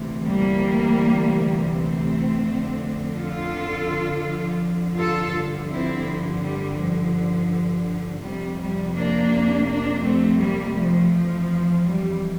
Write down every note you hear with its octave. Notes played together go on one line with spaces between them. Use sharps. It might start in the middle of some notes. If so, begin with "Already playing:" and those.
Already playing: D2 C3 E3
G3 A#3
A3 C4
F2 D3 F3
F4 A4
F4 A4
G2 D3 F3
C4 E4
F3
G3
F3
F2 C3 F3 G3
G3
A#3 D4
A#3 D4
A3 C4
G3 A#3
F3 A3
F2 E3 F3
G3